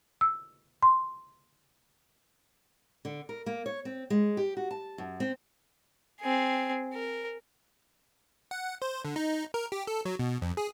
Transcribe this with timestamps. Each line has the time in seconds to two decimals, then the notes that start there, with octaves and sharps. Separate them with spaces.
0.21 E6
0.83 C6
3.05 D3
3.29 A#4
3.46 A#3
3.66 C#5
3.85 C4
4.10 G#3
4.37 G4
4.57 F#4
4.71 A5
4.98 F#2
5.20 C4
6.21 C4 G#4
6.93 A#4
8.51 F#5
8.82 C5
9.05 D3
9.16 D#4
9.54 A#4
9.72 G4
9.87 A4
10.05 F#3
10.19 B2
10.42 F2
10.57 G#4